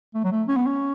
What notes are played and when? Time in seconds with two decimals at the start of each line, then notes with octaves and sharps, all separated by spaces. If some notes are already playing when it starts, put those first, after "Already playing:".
0.15 A3
0.24 F#3
0.32 A3
0.48 C#4
0.56 B3
0.66 C#4